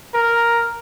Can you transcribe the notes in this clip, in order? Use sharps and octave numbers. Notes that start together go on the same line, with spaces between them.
A#4